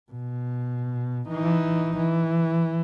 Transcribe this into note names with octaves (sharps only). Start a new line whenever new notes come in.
B2
E3 D#4
E3